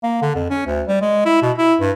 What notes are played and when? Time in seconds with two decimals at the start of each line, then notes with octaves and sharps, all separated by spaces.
0.03 A#3
0.22 D3
0.35 F2
0.50 C#4
0.67 D2
0.88 G3
1.01 G#3
1.26 E4
1.43 B2
1.58 E4
1.80 G2